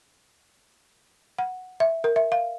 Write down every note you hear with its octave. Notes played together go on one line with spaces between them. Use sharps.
F#5
E5
A#4
E5
F5